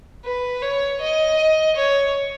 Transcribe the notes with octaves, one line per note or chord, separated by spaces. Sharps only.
B4
C#5
D#5
C#5